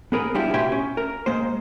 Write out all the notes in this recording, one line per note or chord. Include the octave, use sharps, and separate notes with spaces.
B3 G#4 A#4 B4
G3 B3 D4 E4 F4 G4
B2 G4 E5 G5 G#5 C6
C#4
A#4
G#3 A#3 C5